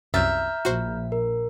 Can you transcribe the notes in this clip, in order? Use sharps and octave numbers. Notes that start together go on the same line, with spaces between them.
C2 F#2 E5 A#5 F6 G6 A6
A#1 F#4 C5
A#4